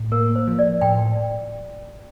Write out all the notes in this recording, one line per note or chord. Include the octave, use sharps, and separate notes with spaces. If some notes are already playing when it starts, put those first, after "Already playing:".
Already playing: A2
A#3 A#4
C5
F3
D5
A2 G5